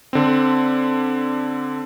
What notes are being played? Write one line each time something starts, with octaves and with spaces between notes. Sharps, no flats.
D3 C4